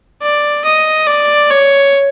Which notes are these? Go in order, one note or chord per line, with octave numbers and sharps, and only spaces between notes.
D5
D#5
D5
C#5